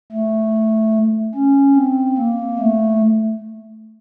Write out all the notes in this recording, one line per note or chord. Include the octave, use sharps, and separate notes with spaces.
A3
C#4
C4
A#3
A3